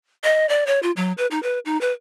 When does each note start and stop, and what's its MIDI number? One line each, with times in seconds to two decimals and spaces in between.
0.24 0.48 75
0.49 0.66 74
0.67 0.79 73
0.83 0.91 65
0.97 1.12 54
1.18 1.27 71
1.31 1.42 63
1.43 1.59 71
1.65 1.79 63
1.81 1.92 71